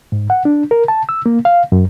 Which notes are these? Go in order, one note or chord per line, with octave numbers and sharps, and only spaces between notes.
G#2
F#5
D4
A#4
A5
E6
A#3
F5
F#2